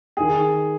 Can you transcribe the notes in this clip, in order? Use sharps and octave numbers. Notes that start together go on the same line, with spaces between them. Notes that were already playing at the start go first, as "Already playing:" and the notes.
D#3 G#4